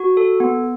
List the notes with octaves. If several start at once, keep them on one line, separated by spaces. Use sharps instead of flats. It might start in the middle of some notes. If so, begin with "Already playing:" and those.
Already playing: F#4
A4
B3